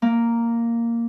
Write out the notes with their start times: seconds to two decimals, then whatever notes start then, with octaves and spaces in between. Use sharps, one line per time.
0.02 A#3